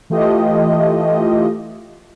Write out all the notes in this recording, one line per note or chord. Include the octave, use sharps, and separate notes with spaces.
E3 A3 F4 G4 D#5